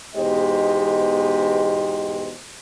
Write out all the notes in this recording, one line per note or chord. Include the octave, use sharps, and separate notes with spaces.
E2 G#2 B2 G4 C5 D#5